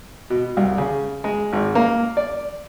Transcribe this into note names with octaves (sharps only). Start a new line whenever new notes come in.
B2
C2
C#3
G#3
G#1
A#3
D5